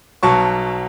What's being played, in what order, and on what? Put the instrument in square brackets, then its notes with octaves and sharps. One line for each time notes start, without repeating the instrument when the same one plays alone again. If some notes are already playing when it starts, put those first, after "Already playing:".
[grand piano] B1 B2 F#3 A5 C#6